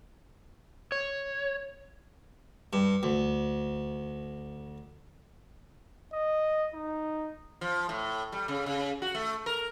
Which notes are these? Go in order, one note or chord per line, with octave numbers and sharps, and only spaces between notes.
C#5
G2
D2
D#5
D#4
F3
A2
G3
C#3
C#3
F#4
A3
A#4